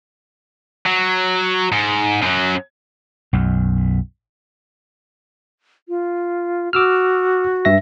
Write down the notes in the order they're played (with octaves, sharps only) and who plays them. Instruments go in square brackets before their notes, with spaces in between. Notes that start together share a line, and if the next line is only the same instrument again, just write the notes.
[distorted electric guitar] F#3
G#2
F#2 F#3
[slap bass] B1 F#2
[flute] F4
[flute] F#4 [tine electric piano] D6 E6 F6
[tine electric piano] G2 E5 A#6